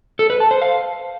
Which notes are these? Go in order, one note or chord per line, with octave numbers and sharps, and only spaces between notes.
A4
B4
A5
C5
F5